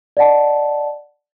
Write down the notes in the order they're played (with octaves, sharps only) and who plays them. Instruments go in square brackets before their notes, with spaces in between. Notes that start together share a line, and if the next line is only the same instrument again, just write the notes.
[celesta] D5 D#5 F#5 A5